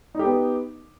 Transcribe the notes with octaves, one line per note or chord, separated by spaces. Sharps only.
B3 D#4 G4